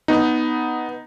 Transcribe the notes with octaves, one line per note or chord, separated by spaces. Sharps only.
B3 D#4